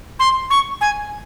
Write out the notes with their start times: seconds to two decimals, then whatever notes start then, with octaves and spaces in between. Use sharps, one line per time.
0.19 C6
0.50 C#6
0.81 G#5